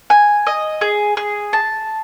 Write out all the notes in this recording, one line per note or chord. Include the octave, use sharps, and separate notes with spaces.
G#5
D#5
G#4
G#4
A5